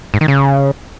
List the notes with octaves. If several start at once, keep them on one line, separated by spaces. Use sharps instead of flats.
G#2
D#3
C#3